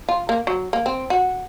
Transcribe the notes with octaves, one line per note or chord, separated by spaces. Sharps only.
F4
A#3
F#3
A#3
C4
F#4